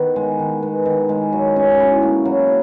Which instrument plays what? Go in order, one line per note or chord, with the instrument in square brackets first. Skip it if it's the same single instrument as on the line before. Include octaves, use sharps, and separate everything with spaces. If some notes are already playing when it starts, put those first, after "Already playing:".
Already playing: [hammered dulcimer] D#3 B3
G#3
D#3
B3
D#3
G#3
F#3
C#4
E4
A#3
F#3